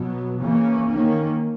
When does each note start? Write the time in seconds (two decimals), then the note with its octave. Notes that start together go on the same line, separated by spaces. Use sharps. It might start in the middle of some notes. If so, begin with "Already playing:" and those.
Already playing: B2 F#3 B3
0.41 C#3 E3 A#3 C#4
0.88 D#3 A#3 C#4